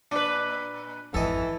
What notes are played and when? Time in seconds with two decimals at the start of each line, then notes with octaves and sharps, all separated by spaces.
0.11 A#2 D4 B4
1.14 G#1 F2 E3 A4 D#5